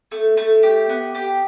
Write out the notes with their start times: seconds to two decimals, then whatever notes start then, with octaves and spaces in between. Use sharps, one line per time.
0.12 A3
0.37 A3
0.63 G4
0.89 B3
1.15 G4